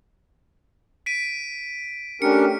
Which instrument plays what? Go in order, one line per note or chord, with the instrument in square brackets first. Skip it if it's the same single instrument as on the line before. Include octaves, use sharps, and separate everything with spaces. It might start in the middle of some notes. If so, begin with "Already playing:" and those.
[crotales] B6 D7 D#7
[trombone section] A3 G4 [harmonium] C#4 D4 A#4 [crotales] C#7